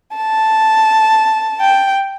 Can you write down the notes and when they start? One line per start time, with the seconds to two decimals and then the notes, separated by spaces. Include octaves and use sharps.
0.16 A5
1.61 G5